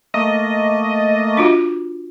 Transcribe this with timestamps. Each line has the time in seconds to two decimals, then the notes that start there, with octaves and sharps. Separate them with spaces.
0.14 A3 A#3 D#5
1.37 D4 F4 F#4